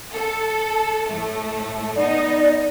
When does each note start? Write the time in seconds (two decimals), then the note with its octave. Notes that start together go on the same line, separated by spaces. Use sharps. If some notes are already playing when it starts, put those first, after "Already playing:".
0.13 A4
1.08 A2 A3
1.96 B3 D#4 D5